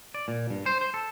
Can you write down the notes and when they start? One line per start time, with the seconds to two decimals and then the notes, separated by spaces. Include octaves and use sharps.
0.14 D5
0.28 A#2
0.50 G2
0.66 C5
0.81 C5
0.94 A4